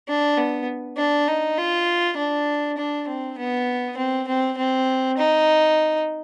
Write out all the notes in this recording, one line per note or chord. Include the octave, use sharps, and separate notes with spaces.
D4
B3
D4
D#4
F4
D4
D4
C4
B3
C4
C4
C4
D#4